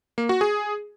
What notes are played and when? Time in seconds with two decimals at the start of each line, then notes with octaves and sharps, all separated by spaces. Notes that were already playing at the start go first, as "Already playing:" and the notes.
0.18 A#3
0.29 F#4
0.41 G#4